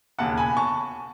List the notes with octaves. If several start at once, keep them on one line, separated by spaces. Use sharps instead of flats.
E1 D#2 C#3 F#5 A5
G#5 B5
A5 C#6